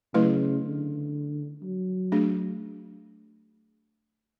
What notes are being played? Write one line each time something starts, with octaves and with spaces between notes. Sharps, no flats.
C#3 F#3 A3 E4 B4
D3
F#3
A3 D4 G#4